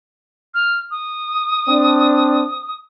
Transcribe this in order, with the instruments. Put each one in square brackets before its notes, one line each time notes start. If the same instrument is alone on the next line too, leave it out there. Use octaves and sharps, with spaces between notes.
[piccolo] F6
D#6
[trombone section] C4 D4